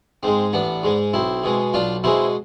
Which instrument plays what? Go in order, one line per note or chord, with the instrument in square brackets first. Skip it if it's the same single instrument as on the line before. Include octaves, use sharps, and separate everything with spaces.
[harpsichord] G#2 G#3 C4
A1 B3 D4
G#2 G#3
B1 C4 E4
B2 G#3
B1 D4 F4
B2 G#3 C4 E4